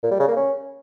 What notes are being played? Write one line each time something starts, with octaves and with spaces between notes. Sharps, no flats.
A#2
G3
C#3
A#3
C#4